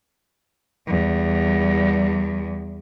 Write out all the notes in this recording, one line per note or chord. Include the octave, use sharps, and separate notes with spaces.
E2 G3